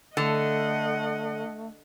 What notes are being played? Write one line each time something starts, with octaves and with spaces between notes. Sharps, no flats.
D3 A3 D#5 F#5